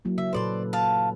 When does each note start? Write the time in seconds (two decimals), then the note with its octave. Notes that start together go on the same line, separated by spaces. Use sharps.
0.05 F#3 A#3 E4
0.18 C#3 E5
0.33 A#2 A4 B4 C5 D5 C6
0.73 F5 A5